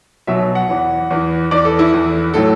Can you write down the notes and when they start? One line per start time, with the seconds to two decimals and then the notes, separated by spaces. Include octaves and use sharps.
0.27 B1 B2 F#3 E5
0.55 F#5
0.69 E2 E3
1.10 E2 E3
1.51 E2 E3 D5
1.65 A4
1.79 E4
1.93 E2 E3 E4
2.34 A2 F#3 A4